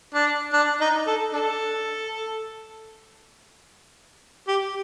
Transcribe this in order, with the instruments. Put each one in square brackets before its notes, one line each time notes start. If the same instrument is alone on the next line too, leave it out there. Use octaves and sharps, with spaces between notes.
[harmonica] D4
D4
D#4
A4
D4 A4
G4